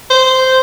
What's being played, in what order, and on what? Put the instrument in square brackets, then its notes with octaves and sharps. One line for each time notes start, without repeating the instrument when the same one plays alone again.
[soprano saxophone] C5